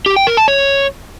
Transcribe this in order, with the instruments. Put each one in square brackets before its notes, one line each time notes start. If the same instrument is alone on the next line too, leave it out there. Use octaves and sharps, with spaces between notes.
[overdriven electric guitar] G4
G5
A#4
A5
C#5